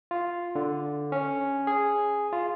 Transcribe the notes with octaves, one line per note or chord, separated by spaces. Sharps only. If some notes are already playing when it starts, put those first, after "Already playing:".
F4
D3
C#4
G#4
F4